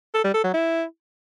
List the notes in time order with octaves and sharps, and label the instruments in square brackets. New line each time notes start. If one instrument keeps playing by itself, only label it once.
[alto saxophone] A4
G3
A4
F#3
E4